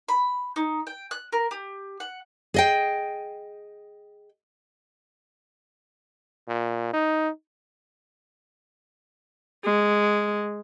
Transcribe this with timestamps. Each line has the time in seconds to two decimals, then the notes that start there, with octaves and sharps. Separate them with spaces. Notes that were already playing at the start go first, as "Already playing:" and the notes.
0.08 B5
0.56 D#4
0.87 G5
1.11 F#6
1.32 A#4
1.51 G4
2.00 F#5
2.54 G#4 D#5 G5
6.48 A#2
6.93 D#4
9.64 G#3